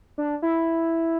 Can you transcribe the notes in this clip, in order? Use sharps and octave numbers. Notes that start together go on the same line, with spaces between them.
D4
E4